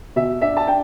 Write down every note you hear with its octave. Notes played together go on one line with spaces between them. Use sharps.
B2 E5
D4 E5
A5
D4 G5